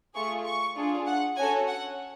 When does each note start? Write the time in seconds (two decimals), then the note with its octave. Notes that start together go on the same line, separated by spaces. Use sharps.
0.15 A3 F4 G#4 C#6
0.46 C#6
0.76 D4 F4 G#4
1.07 F#5
1.37 C#4 F#4 A4 G#5
1.68 F#5